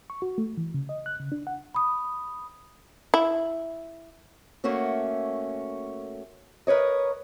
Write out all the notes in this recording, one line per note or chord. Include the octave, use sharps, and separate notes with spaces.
C#6
F#4
A3
E3
C#3
D#5
F#6
C#3
D4
F#5
B5 D#6
E4
A3 A#3 C#4 F#4
A#4 B4 C#5 D#5